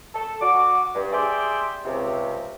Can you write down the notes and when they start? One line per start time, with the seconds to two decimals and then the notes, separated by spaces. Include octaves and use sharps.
0.13 A4
0.41 F#4 D6
0.95 G2
1.13 G4 G#4 D5 E5 G5 C6
1.84 C#2 C3